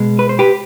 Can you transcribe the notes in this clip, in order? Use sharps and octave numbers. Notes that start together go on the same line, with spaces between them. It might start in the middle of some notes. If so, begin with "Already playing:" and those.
Already playing: B2 G#3
B4
C5
G4 B4